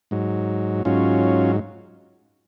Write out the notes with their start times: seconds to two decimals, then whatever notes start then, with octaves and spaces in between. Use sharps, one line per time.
0.11 G#2 F#3
0.85 G#2 F#3 C#4 F4